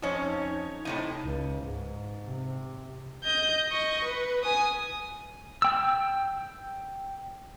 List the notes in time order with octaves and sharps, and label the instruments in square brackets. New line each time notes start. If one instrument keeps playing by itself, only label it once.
[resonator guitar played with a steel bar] F2 C#4 [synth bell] D#4 C#5
[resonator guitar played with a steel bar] A2 C3 D#4 [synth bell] D#7
[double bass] C#2
G#2
C3
[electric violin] D#5 G6
D#5 C#6
B4
G#5 D#6
[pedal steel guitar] G5 E6